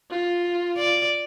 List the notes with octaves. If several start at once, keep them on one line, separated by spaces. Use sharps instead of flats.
F4
D5